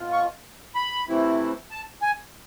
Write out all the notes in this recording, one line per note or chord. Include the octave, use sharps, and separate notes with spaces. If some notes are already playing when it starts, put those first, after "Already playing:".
Already playing: B2 F4
C#6
B5
C3 E3 A3 C4 E4
A5
G#5